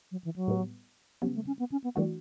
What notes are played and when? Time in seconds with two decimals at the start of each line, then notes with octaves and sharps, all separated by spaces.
0.11 F#3
0.24 E3
0.36 F#3
0.48 A2 G3 B3
1.22 C#3 F#3 G3 B3
1.35 A3
1.47 C#4
1.59 B3
1.72 C#4
1.84 B3
1.96 E3 G3 A3 D4 F#4